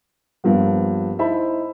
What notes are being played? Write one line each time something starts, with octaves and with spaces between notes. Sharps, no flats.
G2 F3 A#3 B3
D#4 E4 C5 E5 A5 B5